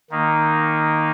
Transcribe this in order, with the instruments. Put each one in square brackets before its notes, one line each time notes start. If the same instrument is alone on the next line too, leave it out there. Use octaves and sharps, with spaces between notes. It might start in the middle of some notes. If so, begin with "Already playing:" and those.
[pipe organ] D#3 A#3 D#4